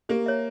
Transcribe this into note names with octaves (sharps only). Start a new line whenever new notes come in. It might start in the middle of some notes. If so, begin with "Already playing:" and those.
A#3 G4
C#5 E5